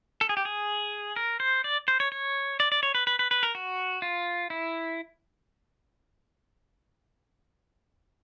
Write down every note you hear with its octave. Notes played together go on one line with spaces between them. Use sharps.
A4
G#4
G4
G#4
A#4
C5
D5
C5
C#5
C#5
D5
D5
C#5
B4
B4
B4
B4
A#4
F#4
F4
E4